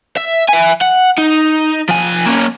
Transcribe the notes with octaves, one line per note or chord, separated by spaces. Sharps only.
E5
E5 G#5
F#5
D#4
F3 G#5
A#3 C#4